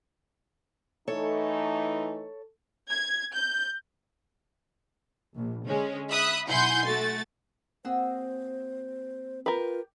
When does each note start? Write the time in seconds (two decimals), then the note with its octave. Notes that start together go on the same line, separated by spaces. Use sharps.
1.08 E3 A3 D#4 A4 C#5
2.90 G#6
3.34 G6
5.35 A#1
5.67 D3 G#3 C#4
6.10 E5 B5 D#6 F#6
6.47 B1 E4 F#5 G#5 C6 G6
6.85 A3 F#4 A6
7.85 A#3 C4 F#4 G#4 C5 E6
9.46 F4 G4 A#4 B4 G5